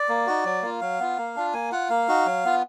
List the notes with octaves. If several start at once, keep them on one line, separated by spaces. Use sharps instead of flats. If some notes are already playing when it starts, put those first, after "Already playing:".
Already playing: D5
A#3
D#4 F#4
F#3
A#3 F4
F#3 F5
B3 F4
A#3
D4 F4
A#3 G#5
F4 F#5
A#3 F5
D#4 F#4
F#3
B3 F4